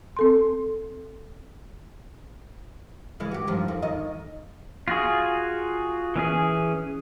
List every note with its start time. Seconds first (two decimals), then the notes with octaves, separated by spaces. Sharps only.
0.17 C4 A4 C6
3.20 C#3 E3 G#3
3.31 F#4 G4
3.47 G2 D#3 F3
3.68 F2
3.82 F2 D#3 D#5
4.88 F4 F#4 G#4
6.16 E3 C#4 G#4